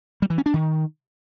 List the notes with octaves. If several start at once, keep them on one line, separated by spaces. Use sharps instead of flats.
G3
E3
C#4
D4
D#3